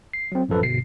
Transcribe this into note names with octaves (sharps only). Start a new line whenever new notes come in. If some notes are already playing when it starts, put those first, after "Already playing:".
C7
F#3 C4
A1 F#2 F3 A4 B4
G1 B2 C7